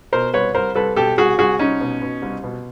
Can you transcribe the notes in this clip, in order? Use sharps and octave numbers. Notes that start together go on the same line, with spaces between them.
B2 A#4 C5
C2 B4 C#5
C2 A#4 C5
C2 A4 B4
B2 G4 A4
C2 F#4 G#4
C2 F#4 G#4
C2 C#4 D#4
B2
B2
C2
B2